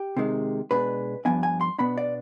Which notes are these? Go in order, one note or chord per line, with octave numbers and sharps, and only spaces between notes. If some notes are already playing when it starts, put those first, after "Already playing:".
Already playing: G4
C3 D#3 G#3
B2 G#3 D4 B4
G2 F3 B3 D4 G#5
G#5
C6
B2 B3 D4 B5
D5